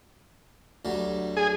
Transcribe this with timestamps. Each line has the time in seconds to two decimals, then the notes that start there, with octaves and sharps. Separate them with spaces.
0.85 D2 F#3 G3
1.37 G#4